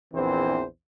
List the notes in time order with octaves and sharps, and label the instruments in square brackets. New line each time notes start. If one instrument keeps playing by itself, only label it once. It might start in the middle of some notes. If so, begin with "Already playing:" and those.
[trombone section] A#1 E2 E3 C4 C5